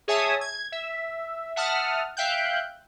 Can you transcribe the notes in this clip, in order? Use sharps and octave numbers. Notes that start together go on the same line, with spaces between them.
G#4 C#5 E5 G#5 A5 D#6
G#6
E5
E5 F#5 A5 D#6 F6
E5 F5 G5 F#6 G6